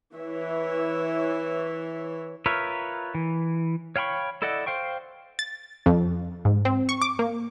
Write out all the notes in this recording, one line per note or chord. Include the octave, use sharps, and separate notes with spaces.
E3 C#5 E5
F4 A#4 B4 C#5 E5
E3
C#5 F5 G5 B5 C#6
E4 A4 D5 D#5 F#5
C5 F5 G5 C#6
A6
F2
G#2
C4
C#6
D6
A#3